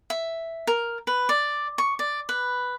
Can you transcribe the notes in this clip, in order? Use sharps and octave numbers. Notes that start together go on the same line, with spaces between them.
E5
A#4
B4
D5
C#6
D5
B4